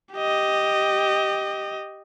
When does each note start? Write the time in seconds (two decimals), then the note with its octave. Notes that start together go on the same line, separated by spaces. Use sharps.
0.14 G4 D#5